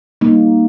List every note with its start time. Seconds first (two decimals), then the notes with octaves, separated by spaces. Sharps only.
0.21 G3 A#3 D#4